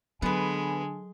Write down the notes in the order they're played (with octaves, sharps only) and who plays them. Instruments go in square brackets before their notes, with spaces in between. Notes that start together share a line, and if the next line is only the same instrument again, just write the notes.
[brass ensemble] D3 A4 G#5 [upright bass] F#3 [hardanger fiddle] G#3 [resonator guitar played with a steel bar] B3 B4